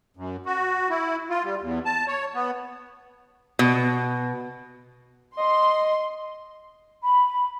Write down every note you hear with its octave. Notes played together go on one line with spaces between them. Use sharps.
F#2
F#4
E4
F4
G3
E2
A5
C#5
B3
B2
D#5 C6
B5